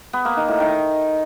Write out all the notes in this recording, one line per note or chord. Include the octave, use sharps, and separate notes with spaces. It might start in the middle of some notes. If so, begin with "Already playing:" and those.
B3
A#3
D#3
A2
D#3